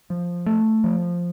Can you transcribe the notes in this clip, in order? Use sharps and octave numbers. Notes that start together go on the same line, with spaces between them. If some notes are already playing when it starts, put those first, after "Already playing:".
F3
A3
F3